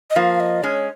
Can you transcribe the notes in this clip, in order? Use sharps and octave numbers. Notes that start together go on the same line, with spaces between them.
D#5
F3 A#3 F5
D#5
G#3 C#4 C#5